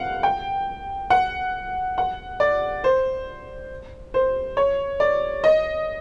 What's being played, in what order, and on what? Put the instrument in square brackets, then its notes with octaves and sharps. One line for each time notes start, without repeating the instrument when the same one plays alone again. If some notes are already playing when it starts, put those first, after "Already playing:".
Already playing: [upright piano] F5 F#5
G5
F#5
F#5
D5
C5
C5
C#5
D5
D#5